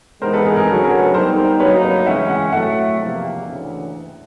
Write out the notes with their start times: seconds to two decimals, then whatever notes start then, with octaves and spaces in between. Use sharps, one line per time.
0.22 G#2 E3 G#3 B3 D#4 A#4 C5
0.33 A4 B4
0.45 G#4 A#4
0.56 G#4 A#4
0.68 D2 C#3 F#3 A4
0.83 G#4 A#4
0.99 A4 B4
1.14 G3 B3 D#4 A#4 C5
1.37 A#4 C5
1.60 D2 D3 F#3 A#3 D#4 B4 C#5
1.83 B4 C#5
2.06 F#2 C#3 E3 G#3 C#4 E5 F#5
2.29 E5 F#5
2.52 A2 F#3 A3 E5 F#5
2.98 E2 C3 F3 A#3
3.45 D2 C#3 E3